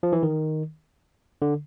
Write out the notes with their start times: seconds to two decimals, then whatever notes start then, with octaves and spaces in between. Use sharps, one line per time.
0.03 F3
0.13 E3
0.23 D#3
1.42 D3